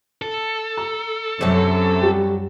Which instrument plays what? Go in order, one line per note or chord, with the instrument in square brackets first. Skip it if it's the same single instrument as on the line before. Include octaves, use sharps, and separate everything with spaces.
[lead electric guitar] A4
[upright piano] A#5
[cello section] F#2 F#3 [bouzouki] C3 A3
[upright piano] G3 F#4 G4